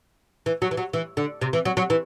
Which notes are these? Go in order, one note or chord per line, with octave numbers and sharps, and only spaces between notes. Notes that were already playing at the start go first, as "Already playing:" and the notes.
E3
F#3
E3
F#3
E3
D3
C3
E3
F#3
F#3
E3